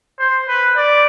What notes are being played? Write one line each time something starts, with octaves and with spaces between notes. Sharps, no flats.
C5
B4
D5